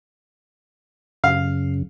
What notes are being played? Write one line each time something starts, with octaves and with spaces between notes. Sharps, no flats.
F#2 C#3 F5